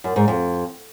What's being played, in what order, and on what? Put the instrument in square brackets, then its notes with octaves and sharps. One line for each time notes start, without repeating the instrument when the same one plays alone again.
[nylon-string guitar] F#2
G#2
F2